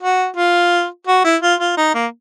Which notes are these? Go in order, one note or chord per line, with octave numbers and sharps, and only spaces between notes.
F#4
F4
F#4
E4
F4
F4
D#4
A#3